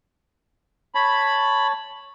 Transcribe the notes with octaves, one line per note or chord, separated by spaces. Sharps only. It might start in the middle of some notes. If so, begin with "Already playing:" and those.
C#5 A5 B5